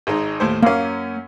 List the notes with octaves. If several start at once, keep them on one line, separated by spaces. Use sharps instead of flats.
G#1 G#3 D#4
D#2 A2 C5
F#2 A#3 C#4 F5